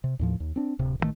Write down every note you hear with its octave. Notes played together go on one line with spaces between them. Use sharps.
C3
D#2 A2 F3
D#2
C4 D4
D1 C3
A1 G2 D#3 A3